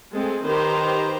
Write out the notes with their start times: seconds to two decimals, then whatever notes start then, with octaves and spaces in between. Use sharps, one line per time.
0.13 G#3 A3 C4 G#4 A4
0.44 D#3 G4 B4 C5 A#5